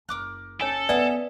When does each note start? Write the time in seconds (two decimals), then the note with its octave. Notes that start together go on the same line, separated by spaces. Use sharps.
0.09 F#1 A#4 D6 F#6
0.61 C#4 A4 C#5 G#5
0.89 B3 G#4 B4 D5 E5 F#5 G#5